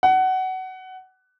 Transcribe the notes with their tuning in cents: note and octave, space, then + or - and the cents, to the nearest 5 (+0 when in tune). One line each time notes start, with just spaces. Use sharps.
F#5 +20